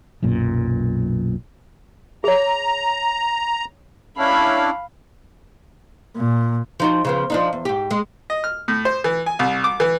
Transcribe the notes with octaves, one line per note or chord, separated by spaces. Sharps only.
B1 F#2 A#2
G#4 C#5 A#5
C#4 D4 E4 F5 B5
A#2
F3 D#4 F#4
C#3 F3 B3
F3 D4 D#4
E2
G#2 G4
G#3
D#5
F6
A2
C5
E3
G#5
C2
D6
E3